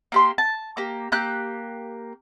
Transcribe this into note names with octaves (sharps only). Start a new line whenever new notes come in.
A#3 G4 C6
A5
A#3 G4
A#3 G4 F#6 G6